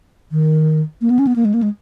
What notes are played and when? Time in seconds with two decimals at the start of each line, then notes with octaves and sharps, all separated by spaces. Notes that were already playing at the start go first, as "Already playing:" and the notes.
0.32 D#3
1.01 A#3
1.10 B3
1.19 C#4
1.27 B3
1.36 A#3
1.45 G#3
1.54 A#3
1.63 G#3